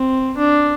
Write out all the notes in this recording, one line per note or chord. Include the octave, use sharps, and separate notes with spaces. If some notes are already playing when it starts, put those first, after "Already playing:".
Already playing: C4
D4